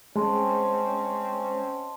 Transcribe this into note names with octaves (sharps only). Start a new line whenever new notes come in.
G#3 C4 C#4 D#5 A5 C6